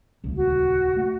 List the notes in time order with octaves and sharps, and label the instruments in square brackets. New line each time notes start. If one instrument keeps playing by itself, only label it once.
[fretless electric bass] D#1 C#2
[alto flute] F#4
[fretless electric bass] A3